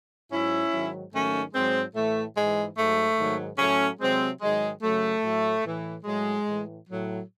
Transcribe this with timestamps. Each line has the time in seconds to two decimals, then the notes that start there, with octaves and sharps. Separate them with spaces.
0.31 G#2 F#3 C#4 E4
0.72 G#2 D#3 F#3
1.13 G#2 D#3 F#3 A3 C#4
1.53 G#2 F#3 G#3 C4
1.94 A2 E3 A3
2.36 G#2 E3 G#3
2.77 G#2 F#3 A3
3.18 G#2 D#3 F#3
3.58 A2 F#3 A3 C#4
4.00 C3 F#3 G#3 C4
4.41 G#2 D#3 F#3 G#3
4.82 F#2 C#3 F#3 A3
5.23 A2 F#3
5.64 A2 E3
6.04 A2 F#3 G#3
6.46 A2 E3
6.87 A2 F#3